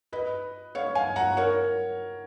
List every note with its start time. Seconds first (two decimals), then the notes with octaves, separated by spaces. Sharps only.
0.13 B4 D#5
0.75 C#5 F5
0.95 F5 G#5
1.16 F#5 A#5
1.37 A#4 C#5